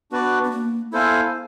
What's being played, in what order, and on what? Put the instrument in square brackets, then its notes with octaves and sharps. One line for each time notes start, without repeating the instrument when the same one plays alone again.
[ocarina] B3 [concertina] D4 F#4 B4 D5
[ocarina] B3
A#3
[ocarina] B3 [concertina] E4 A4 C5 F5 G#5